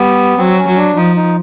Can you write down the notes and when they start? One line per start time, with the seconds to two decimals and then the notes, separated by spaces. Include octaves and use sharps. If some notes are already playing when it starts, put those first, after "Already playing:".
Already playing: G3 B3
0.38 F#3 C4
0.58 C#4
0.68 F#3
0.78 D4
0.96 F3 D#4
1.16 D#4